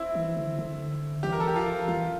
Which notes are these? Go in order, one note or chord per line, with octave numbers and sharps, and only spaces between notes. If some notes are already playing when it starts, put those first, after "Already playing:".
Already playing: C4 E4
E3
D3
D3
E3 G4
A#4
A4
G4
F3 F4
E3 F4